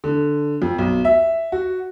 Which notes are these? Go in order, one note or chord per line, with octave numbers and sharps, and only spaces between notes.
D3
F2
B1
E5
F#4